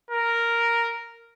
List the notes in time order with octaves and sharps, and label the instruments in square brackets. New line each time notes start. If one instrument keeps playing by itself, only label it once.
[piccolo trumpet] A#4